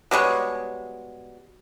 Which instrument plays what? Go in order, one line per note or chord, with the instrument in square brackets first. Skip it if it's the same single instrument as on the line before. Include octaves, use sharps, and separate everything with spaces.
[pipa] B2 G3 G#3 C#5